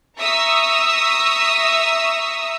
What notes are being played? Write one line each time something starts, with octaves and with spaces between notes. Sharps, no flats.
E5 A#5 C#6 D#6 E6